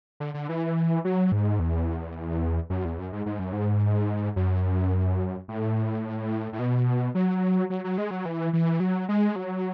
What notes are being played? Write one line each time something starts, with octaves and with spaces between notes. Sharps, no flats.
D3
D3
E3
F#3
G#2
E2
F#2
E2
F#2
G#2
G#2
F#2
G#2
F#2
A2
A2
B2
F#3
F#3
F#3
G#3
F#3
E3
E3
F#3
G#3
F#3